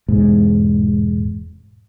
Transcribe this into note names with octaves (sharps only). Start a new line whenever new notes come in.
E1 G#2